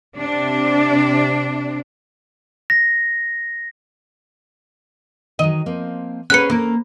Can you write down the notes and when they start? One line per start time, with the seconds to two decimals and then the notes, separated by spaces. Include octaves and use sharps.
0.17 C3 D4
2.70 A#6
5.39 D#3 F#3 D#5
5.66 F3 A#3 C4
6.30 A#3 C#4 G#4 A#4 B4 F#5 F#6 C#7
6.50 A#3 C#4 A4 A#4